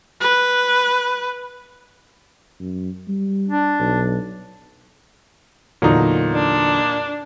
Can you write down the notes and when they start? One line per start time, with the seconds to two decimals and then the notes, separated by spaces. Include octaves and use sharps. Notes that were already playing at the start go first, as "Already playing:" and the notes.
0.21 B4
2.59 F#2
3.08 G3
3.49 D4
3.80 B1
5.82 E2 A#2 D3 F#3 D#4
6.34 D4